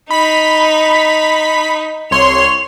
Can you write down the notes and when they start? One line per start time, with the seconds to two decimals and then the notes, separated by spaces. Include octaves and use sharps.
0.11 D#4 B5 B6
2.11 C2 C#5 C6 F7